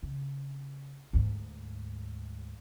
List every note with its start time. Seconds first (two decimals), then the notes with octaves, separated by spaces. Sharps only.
0.03 C#3
1.13 D2 G#2